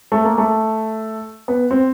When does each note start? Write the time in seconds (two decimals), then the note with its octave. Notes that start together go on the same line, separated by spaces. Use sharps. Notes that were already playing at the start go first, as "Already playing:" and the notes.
0.12 A3
0.24 A#3
0.38 A3
1.48 B3
1.71 C4